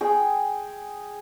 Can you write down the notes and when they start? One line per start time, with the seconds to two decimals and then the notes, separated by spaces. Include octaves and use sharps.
0.01 G#4 G5